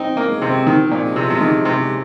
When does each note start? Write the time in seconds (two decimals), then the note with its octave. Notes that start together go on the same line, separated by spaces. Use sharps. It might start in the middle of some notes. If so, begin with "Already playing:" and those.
Already playing: C4 D#4
0.11 D#3
0.17 A#3
0.29 G#3
0.42 C3
0.48 C4
0.66 D#3 F3
0.85 C4
0.91 A#2
1.04 G#3
1.16 C3
1.22 F3
1.30 C3
1.41 D#3 G#3
1.59 C4
1.65 C3
1.78 G#3